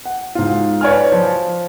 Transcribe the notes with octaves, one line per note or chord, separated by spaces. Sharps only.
F#5
G#2 F4
B4 C#5 D5 G#5 F6
F3